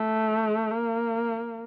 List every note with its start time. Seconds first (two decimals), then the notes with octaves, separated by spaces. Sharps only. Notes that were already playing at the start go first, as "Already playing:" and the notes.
Already playing: A3
0.71 A#3